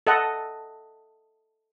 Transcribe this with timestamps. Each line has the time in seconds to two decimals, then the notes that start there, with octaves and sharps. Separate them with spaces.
0.07 A4 D#5 F#5